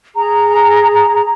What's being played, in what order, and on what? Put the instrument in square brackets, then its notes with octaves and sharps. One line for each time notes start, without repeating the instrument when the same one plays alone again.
[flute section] G#4 A#5